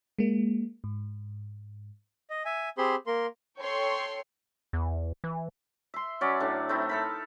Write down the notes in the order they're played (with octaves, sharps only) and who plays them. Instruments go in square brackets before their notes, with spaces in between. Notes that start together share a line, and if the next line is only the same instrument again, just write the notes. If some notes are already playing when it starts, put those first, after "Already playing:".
[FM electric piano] G#3 A#3
G#2
[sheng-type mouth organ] D#5
E5 G#5
C4 G4 G#4 C5 B5 C6
A#3 A#4 C6
[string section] A4 C#5 G5 C6 C#6
[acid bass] E2
E3
[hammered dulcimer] E5 C6
F#3 C#4 D5
A2 D4
A3 C4 D#4 E4
A4 A#4 B5